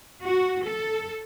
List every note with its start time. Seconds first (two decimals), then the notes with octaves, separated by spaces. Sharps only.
0.23 F#4
0.63 A4